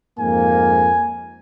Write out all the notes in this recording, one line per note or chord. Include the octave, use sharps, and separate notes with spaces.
F2 G#2 A#3 G#5